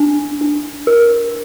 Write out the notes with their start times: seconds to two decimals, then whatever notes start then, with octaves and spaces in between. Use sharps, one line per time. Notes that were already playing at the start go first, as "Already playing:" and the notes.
Already playing: D4
0.41 D4
0.87 A#4